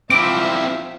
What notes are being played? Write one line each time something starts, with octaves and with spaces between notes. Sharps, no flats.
F3 C4 E4 E5 D6